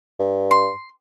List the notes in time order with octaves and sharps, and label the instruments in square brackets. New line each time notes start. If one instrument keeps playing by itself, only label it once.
[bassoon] G2
[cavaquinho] C6